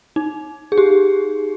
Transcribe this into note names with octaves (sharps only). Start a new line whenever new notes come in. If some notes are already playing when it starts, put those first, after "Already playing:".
D#4
G#4
G4